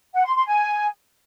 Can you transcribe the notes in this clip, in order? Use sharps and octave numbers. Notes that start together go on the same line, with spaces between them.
F#5
C6
C6
G#5